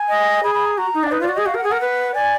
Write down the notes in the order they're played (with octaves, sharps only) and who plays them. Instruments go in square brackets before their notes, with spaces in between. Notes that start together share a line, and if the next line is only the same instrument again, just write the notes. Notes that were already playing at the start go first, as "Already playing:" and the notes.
Already playing: [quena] G#5
[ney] D#5
[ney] G#4 [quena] B5
[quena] B5
A#5
[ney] F#4 [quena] A#5
[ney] D#4
[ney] D4 [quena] D5
[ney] D#4 [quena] B4
[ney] F4 [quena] D5
[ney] F#4
[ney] G#4 [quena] D#5
[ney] F#4 [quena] F5
[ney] A#4 [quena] F#5
[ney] G#4
[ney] A#4 [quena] F#5
[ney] B4
[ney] D5 [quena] G#5